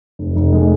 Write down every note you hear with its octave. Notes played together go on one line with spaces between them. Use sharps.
F1
F1
G#3